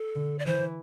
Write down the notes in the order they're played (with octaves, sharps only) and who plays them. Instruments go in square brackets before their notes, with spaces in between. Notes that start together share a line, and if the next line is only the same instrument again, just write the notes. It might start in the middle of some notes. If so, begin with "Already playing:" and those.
Already playing: [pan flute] A4
[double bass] D3
[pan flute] D5
[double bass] E3 [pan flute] C5